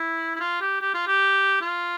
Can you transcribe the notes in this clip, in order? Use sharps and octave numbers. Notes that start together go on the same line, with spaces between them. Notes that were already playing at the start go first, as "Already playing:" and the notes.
Already playing: E4
E4
F4
G4
G4
F4
G4
F4